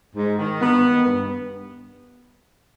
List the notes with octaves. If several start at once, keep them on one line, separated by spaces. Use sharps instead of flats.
G#2
D#3
G2 B3
D#3
G2